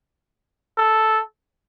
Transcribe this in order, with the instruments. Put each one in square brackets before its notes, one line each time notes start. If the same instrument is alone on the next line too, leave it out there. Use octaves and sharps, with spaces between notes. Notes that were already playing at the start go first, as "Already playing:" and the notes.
[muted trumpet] A4